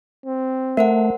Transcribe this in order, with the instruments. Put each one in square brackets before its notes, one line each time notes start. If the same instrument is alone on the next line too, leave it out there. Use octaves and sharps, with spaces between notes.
[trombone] C4
[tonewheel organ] A3 [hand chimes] A#4 C5 F#5